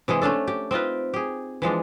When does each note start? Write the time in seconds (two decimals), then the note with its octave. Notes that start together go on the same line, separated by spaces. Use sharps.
0.08 C3 E3 G#3 G#4
0.22 A3 C#4 D4 A4
0.47 G4
0.71 C4 D#4 F4 B4
1.14 G4 G#4
1.62 E3 F3 G#3 D4